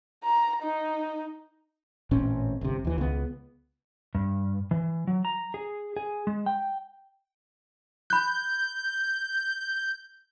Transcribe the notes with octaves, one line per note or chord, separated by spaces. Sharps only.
A#5
D#4
A1 A#2 C4 C#4
G1 C3
D#2 E3
C#2 B3
G2
E3
F#3
A#5
G#4
G#4
G#3
G5
B5 F#6 G6